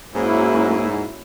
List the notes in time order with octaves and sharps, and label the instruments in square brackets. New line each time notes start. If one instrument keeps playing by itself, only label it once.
[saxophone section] G#2 [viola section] F#3 A#3 C#4 E4